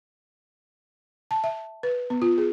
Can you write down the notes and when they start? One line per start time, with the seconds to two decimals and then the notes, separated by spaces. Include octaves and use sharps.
1.31 A5
1.44 E5
1.83 B4
2.10 B3
2.22 F4
2.38 G#4